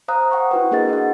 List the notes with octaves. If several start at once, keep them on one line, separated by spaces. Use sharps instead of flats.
C5 F5 A#5 D#6 F#6
F#5 G5 C#6
E4 F#4 B4
A#3 D4 G#4 A#4 D#5 A6
F#4 F#5